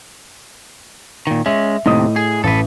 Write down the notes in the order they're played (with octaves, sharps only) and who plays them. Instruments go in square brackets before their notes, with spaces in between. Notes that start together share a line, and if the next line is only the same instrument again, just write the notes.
[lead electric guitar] A#2 D#3
[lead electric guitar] G#3 C#4 [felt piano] E5
[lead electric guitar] D#2 C3 [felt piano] A2 D#5 D#6
[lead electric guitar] G#4
[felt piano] A1 [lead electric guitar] A4 B4